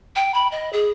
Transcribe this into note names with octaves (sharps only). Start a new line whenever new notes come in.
G5
B5
D#5
G#4